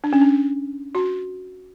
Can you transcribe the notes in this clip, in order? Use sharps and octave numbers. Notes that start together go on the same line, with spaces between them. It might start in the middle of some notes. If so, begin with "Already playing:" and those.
D4
C#4
D4
F#4